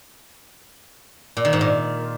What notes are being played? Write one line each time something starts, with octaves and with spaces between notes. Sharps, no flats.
A#2
D#3
G#2
A#2